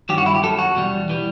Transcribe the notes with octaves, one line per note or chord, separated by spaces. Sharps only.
G2 D#3 F#3 G4
F#4
E4
G4
F#2 F#3 A4
F#4
E2 B2 G3
E3 G3